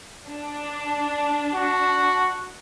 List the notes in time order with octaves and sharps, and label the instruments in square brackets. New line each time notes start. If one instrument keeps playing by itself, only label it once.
[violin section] D4
[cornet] F#4